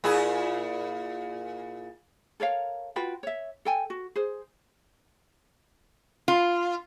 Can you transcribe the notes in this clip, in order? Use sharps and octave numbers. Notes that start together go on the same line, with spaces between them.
A#2 E4 G#4
A4 A#4 C#5 F5
F4 F#4 B4 G5
C#5 E5
A4 G5 G#5
F#4
G#4 C5
F4